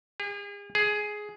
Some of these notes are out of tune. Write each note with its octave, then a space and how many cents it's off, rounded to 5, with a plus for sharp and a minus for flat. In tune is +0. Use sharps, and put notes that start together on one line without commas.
G#4 -40
G#4 +10